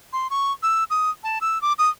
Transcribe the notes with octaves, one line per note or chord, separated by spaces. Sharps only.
C6
C#6
E6
D#6
A5
E6
D6
D#6